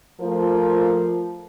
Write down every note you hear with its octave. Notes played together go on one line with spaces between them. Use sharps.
F3 A3 F4 A#4 C5